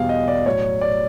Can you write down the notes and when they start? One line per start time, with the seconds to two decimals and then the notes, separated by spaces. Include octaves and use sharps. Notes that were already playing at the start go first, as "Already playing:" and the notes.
Already playing: E2 B2 G3 F5
0.09 D#5
0.28 D5
0.46 A2 F#3 C#5
0.81 D5